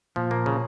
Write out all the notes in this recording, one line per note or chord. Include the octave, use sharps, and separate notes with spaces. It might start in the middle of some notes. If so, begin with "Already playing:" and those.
A#2 F3
A#3
C#3